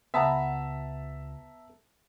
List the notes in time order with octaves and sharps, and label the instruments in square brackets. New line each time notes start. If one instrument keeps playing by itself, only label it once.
[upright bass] C#2 [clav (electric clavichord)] B3 [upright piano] E5 A5 A#5